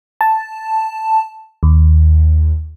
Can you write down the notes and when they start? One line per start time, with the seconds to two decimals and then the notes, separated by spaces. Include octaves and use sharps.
0.21 A5
1.63 D#2